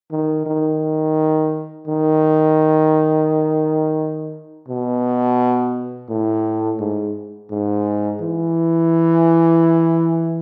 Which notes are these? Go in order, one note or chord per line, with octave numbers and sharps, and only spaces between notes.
D#3
D#3
D#3
B2
A2
G#2
G#2
E3